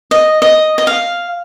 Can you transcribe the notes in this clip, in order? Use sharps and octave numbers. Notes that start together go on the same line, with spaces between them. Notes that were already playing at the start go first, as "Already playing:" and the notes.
D#5
D#5
D#5
F5